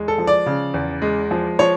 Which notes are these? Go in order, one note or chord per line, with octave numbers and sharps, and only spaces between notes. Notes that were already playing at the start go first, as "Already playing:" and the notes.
Already playing: E2 G#3
A4
F3
D5
C#3
E2
G#3
F3
F3 C#5